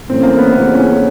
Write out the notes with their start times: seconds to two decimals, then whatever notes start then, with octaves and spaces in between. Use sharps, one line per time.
0.09 A2 E3 A3 C4 C#4
0.23 A#3
0.39 B3
0.53 G1 F2 C#3 E3 B3
0.74 C#4